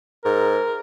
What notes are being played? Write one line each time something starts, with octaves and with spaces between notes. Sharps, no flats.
G#2 A#4